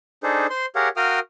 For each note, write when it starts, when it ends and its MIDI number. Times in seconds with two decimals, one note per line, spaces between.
0.23 0.47 62
0.23 0.47 63
0.23 0.47 68
0.23 0.47 69
0.23 0.47 72
0.50 0.66 72
0.50 0.66 84
0.76 0.89 67
0.76 0.89 68
0.76 0.89 70
0.76 0.89 73
0.76 0.89 77
0.76 0.89 78
0.96 1.20 66
0.96 1.20 70
0.96 1.20 77
0.96 1.20 79
0.96 1.20 87
0.96 1.20 89